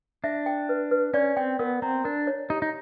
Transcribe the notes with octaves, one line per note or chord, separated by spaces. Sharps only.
D4 E5
G5
B4
B4
C#4 D5
C4 G5
B3 A#4
C4 A#5
D4 A#4
C#5
D#4 G4
D#4